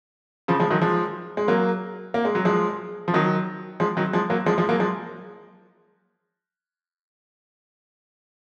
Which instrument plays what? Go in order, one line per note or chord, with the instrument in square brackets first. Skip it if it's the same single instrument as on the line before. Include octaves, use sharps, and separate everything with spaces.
[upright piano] C#3 F3
F3 G#3
D#3 F#3
F3 G#3
G#3
F#3 A#3
A#3
G#3
F#3
F3 G#3
F3
D#3 F#3
F3 G#3
D#3 F#3
F3 G#3
F#3 A#3
F3 G#3
F3 G#3
F#3 A#3
F3 G#3